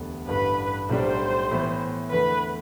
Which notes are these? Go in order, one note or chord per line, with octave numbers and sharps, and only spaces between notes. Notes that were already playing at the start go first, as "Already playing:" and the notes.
Already playing: E1 D2 D3 G3 B3
A1 G2 D3 B4
B1 A2 G3 D4 C5
A2 E3 B3
E2 D3 A3 B4